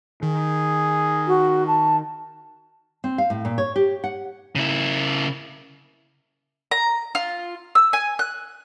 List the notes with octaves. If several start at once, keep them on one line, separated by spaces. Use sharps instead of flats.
D#3 G#4
F#4
A5
C4
F5
A2
A#2
C#5
G4
F#5
C#3 E4
A#5
F4
E6
G#5
F#6